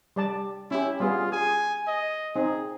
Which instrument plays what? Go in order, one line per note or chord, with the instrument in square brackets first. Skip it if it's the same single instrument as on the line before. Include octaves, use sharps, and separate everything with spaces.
[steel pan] G3 D5 A5
[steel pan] C#4 G4 [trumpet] E4
[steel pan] G3 B3 G#4 [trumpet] F4
[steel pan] G#4 [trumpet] G#5
[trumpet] D#5
[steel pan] C4 D#4 [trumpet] G#4